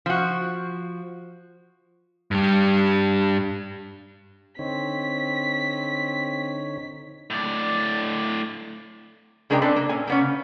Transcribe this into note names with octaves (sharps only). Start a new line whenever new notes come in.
F3 F#4
G2 G3
D3 C4 D#4 C#5 B6
A2 D5
C#3 G#3 D4 A#4 D5 G5
C4 D4 A4 B4 D5
A#3
A#2 C#4 G#5
A#3 B3 C#4
C#3